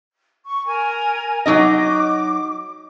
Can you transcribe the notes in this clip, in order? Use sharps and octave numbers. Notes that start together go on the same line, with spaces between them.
C#6
A#4 G#5
F#3 D#4 D#5 D6